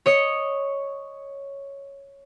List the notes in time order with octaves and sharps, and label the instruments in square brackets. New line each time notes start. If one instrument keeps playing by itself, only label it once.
[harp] C#5 D#5 C#7